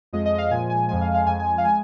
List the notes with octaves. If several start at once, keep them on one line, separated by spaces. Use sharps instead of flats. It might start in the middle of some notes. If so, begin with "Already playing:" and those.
F2 F3 G#3 D#5
D#5
F5
A#2 F3 G#3 G#5
G#5
F2 F3 G#3 G#5
F5
F5
F2 F3 G#3 G#5
G#5
F5
G#3 G#5